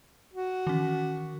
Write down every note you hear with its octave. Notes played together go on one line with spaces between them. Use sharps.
F#4
D#3 E3 C#4